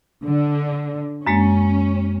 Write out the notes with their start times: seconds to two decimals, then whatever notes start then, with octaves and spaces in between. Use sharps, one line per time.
0.24 D3
1.27 F#2 G#3 A#3 C#4